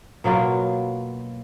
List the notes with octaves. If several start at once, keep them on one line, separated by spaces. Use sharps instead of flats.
B2 F#3 A#3 F4